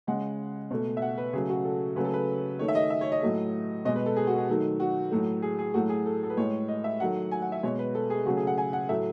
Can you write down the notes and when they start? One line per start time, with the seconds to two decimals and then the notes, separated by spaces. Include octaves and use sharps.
0.07 C#3 G#3 F#5
0.71 B2 A3
0.97 E5
1.02 F#5
1.18 B4
1.33 C#3 F#3 A3 G#4
1.49 F#4
1.65 A4
1.96 C#3 F#3 A3 B4
2.05 A4
2.14 B4
2.59 D#3 A3 C#5
2.68 E5
2.75 D#5
2.90 E5
3.01 C#5
3.12 D#5
3.22 A2 F#3 A3
3.85 B2 D#5
3.88 G#3
3.96 B4
4.06 A4
4.16 G#4
4.27 F#4
4.38 G#4
4.48 D#3 F#3 A3
4.80 F#4
5.11 A2 F#3 A3
5.42 G#4
5.59 G#4
5.74 A2 F#3 A3 F#4
5.89 G#4
6.06 A4
6.23 A4
6.30 B4
6.37 A2 G#3 C#5
6.68 D#5
6.84 E5
7.00 D#3 F#3 A3 F#5
7.31 G#5
7.42 F#5
7.52 E5
7.63 B2 G#3 C#5
7.79 B4
7.95 A4
8.10 G#4
8.26 C#3 F#3 A3 F#4
8.37 G#4
8.47 F#5
8.58 G#5
8.73 F#5
8.89 A2 F#3 A3 E5